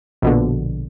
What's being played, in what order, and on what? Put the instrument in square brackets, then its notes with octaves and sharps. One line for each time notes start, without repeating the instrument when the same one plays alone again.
[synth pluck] A#1 B2 D3